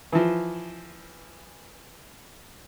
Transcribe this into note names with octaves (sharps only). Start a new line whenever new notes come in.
E3 F3